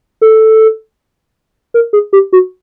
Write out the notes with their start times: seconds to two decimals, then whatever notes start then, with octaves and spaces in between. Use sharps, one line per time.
0.21 A4
1.74 A#4
1.93 G#4
2.13 G4
2.33 F#4